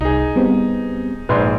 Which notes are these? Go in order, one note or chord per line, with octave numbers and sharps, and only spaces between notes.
C2 D#4 G#4
G3 B3 C4
A#1 G#2 B4 D5 C6